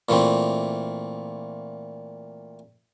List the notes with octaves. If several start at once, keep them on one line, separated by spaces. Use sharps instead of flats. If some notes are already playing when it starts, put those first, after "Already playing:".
A#2 E3 A3 C4